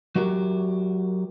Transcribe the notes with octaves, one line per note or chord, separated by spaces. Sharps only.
F#3 F#4 G4 A#4